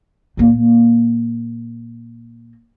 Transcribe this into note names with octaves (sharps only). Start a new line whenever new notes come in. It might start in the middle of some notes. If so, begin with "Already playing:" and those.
A#2 A#3